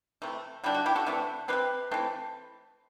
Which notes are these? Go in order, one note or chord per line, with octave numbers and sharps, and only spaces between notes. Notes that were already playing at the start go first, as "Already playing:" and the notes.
C3 E3 A3
D3 G3 D4 E4 G4
F#4
E4 G4
F#4 A4
C3 E3 A3 D4
C3 G3 C4 G4 B4
E3 A3 C4